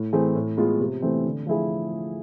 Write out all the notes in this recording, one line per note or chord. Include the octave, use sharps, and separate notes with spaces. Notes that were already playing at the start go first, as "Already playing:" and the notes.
Already playing: A2
E3 A3 C4 G#4
A2
G#3 B3 F4
C3
E3 A3 C4
D3
F3 A3 E4 G#4